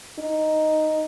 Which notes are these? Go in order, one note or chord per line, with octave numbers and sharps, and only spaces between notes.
D#4